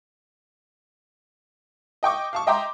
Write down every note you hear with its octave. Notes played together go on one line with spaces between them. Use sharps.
D#5 G5 C#6 D6
F5 A5 C#6
D#5 E5 G5 A#5 C6 D6